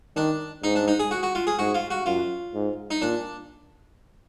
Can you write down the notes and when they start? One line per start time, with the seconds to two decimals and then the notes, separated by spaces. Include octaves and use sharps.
0.16 D#3 D4
0.64 G#2 D#4
0.75 D4
0.88 D#4
1.00 G#4
1.11 F#4
1.23 F#4
1.35 F4
1.47 G#4
1.59 G#2 F#4
1.75 F4
1.90 F#4
2.06 F#2 F4
2.54 G#2
2.91 D#4
3.01 A#2 D4